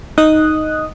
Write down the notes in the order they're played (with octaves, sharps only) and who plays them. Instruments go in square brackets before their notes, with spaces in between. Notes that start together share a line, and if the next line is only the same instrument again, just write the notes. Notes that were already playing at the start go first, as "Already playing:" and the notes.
[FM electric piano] D#4 D#5 D#6 F#6